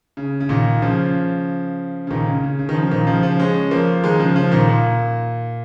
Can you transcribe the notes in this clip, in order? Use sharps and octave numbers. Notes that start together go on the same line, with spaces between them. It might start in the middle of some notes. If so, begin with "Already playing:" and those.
C#3
C#3
A#2 D#3
C#3 F3
C#3
A#2 D#3
C#3
C#3
C#3
D#3
C#3 F3
A#2 D#3
C#3 F3
C#3 F3
G#3 C#4
F3 A#3
D#3 G#3
C#3 F3
C#3 F3
A#2 D#3
A#2